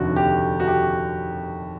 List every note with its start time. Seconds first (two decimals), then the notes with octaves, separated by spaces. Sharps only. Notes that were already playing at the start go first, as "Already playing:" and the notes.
Already playing: F1 D#2 D3 F#4
0.16 G4
0.60 F#4
0.68 G4